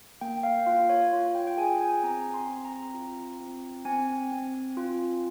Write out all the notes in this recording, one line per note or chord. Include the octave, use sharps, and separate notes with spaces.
A#3 G5
F5
F4 F5
C#5
F4
G5
G5
G#4 G#5
G#5
C4 A#5
C6
C4
A#5
F4
C4
C4 G#5
C4
F4